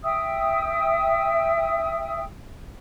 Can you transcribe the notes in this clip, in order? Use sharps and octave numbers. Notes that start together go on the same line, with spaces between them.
E5 G5 D#6 E6